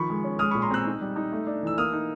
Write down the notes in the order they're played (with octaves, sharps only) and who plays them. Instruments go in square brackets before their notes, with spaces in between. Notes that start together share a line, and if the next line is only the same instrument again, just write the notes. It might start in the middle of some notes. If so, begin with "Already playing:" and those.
Already playing: [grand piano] D#3 F3 B5 C#6
G#3
C#4
G#3 D#6 F6
A#2 B5 C#6
A#5 C6
C4 E6 F#6
D#4
G3
D#4
A3
D4
E3 E6
A#3 D#6 F6
D#4